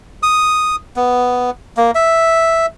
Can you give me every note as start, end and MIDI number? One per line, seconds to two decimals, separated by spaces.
0.23 0.76 87
0.96 1.50 59
1.77 1.91 58
1.95 2.66 76